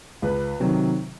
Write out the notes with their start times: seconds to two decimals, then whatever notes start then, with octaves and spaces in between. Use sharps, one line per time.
0.22 C#2 B4
0.60 C3 D#3 F#3